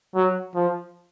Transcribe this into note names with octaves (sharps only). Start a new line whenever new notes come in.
F#3
F3